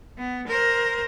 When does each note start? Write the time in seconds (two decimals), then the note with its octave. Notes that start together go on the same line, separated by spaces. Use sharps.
0.18 B3
0.48 A#4 C5